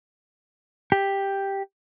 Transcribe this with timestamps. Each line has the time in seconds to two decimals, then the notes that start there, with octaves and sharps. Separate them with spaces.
0.92 G4